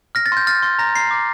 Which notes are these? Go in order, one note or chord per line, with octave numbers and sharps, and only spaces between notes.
F6 A#6
A6
C6 G6
F6 A6
C6 A6
A#5 A#6
A#5 C7
D6